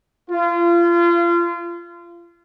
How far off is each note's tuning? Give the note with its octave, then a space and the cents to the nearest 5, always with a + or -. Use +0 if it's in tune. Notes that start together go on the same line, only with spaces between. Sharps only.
F4 -30